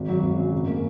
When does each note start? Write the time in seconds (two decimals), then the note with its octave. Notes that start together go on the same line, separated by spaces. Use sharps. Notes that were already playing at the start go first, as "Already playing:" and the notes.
Already playing: G#1
0.08 F#3
0.23 G#1
0.37 F#2
0.52 C#3
0.67 A#3